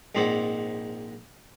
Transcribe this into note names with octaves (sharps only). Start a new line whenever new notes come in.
A#1 G#2 C4 C5 D5 F#5